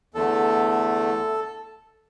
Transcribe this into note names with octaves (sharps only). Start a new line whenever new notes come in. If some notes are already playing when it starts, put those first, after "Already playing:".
E2 D3 A3 A4